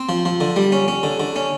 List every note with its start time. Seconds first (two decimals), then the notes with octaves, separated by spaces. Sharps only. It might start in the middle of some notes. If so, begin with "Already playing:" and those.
Already playing: C4
0.09 F3
0.25 F3
0.41 D3
0.56 G3
0.72 C#4
0.88 C#4
1.03 D3
1.20 D3
1.36 C#4